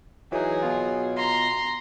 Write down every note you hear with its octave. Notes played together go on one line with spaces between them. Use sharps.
E3 F#3 D#4 G#4
B2 F4
A#5 C6